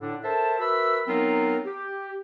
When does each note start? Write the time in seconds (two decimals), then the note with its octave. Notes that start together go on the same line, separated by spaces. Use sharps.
0.01 A2 D3 D4
0.23 A4 A#4 C5 E5 A5
0.59 F#4 A#4 B4 E5 B5 E6
1.07 F#3 B3 C4 D#4 F4 A#4
1.65 G4